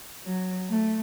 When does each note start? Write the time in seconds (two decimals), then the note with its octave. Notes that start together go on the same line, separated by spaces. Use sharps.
0.24 F#3
0.70 A3